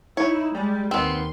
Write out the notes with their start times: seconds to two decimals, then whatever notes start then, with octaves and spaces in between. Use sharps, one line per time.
0.17 D#4 E4 C#5
0.55 G3 G#3
0.91 D#2 B3 C4 C6